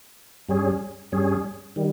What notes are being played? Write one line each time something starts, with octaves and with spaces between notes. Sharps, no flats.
G2 G3 C#4 G#4
G2 G3 C#4 G#4
D#3 G3